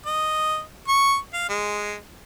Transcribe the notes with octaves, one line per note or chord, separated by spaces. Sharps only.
D#5
C#6
F5
G#3